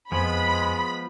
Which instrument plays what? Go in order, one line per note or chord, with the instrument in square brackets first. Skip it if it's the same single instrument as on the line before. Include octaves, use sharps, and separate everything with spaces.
[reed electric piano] F2 C5 G#5 [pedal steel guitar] F3 B3 [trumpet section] G#3 [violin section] B5